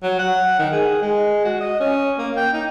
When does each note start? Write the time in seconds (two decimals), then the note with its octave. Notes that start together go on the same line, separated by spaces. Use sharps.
0.03 F#3
0.19 F#5
0.59 D#3
0.73 G#4
1.02 G#3
1.44 F#4
1.60 D#5
1.80 C#4
2.18 A#3
2.36 G5
2.53 D#4